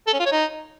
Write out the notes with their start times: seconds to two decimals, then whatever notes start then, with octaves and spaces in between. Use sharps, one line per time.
0.07 A4
0.13 C#4
0.20 F4
0.26 C#5
0.32 D#4